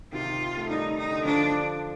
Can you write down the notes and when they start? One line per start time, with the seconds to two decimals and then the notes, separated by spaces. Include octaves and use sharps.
0.12 C3 D#3 F4
0.57 A3
0.69 D#3 G3 D#4
0.97 D#4
1.10 D3
1.18 D#3
1.25 D3 F3 D4